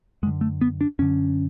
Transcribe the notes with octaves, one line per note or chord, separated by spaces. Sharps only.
F#2 D3 G#3
A3
B3
D4
F#2 D3 C#4